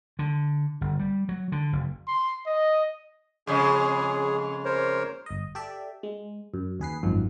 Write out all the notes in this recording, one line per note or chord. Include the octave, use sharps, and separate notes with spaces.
D3
G1
G3
F#3
D3
F#1
C6
D#5
F2 C#3 G#3 G#4
A#4 C5 C#5
G1 D#5
G4 A4 D5 E5
G#3
F#2
D#2 G#4 B4 C7
G#1 F#2 D#3 F3